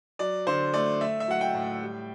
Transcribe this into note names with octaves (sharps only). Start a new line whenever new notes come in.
F#3 D5
D3 C5
A3 D5
A3 E5
E5
F#3 F#5
G5
A2
G3